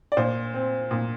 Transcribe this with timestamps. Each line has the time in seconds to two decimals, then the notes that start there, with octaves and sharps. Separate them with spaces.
0.12 D5
0.17 A#2 C5
0.54 C4
0.91 A#2